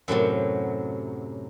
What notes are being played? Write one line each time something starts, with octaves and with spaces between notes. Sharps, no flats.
F#2 A2 C3 F#3